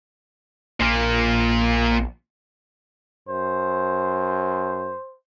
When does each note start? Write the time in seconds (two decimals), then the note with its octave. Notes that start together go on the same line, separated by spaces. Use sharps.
0.80 A#1 A#2 A#3
3.29 F#2 C5